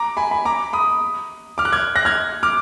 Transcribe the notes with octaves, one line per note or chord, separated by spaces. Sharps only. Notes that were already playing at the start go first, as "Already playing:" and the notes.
Already playing: A#5 D6
G#5 B5
G#5 B5
A#5 D6
B5 D#6
D6 F6
F#6
F6 G#6
F#6 A#6
F6 G#6
D6 F6